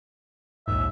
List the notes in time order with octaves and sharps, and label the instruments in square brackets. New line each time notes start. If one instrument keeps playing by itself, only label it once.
[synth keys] A#1 D#2 G#2 [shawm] E5